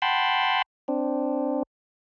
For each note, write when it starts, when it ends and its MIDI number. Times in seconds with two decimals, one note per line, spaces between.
0.02 0.62 78
0.02 0.62 79
0.02 0.62 81
0.02 0.62 83
0.02 0.62 84
0.88 1.63 60
0.88 1.63 62